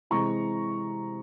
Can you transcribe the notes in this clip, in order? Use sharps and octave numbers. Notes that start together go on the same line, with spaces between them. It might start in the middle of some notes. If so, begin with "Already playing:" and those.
C3 E3 G#3 C4 A#5 C#6